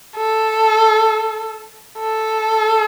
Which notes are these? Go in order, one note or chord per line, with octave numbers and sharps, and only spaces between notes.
A4
A4